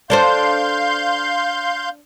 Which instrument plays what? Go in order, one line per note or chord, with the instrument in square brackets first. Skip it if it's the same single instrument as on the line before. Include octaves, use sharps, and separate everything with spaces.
[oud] D4 A4 C5 [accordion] F5 C6 G6